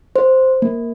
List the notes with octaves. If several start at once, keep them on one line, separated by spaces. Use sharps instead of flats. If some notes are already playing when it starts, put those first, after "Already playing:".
C5
A#3